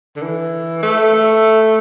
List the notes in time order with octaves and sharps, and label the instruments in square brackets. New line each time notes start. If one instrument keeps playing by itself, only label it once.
[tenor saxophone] D3
E3
A3
A3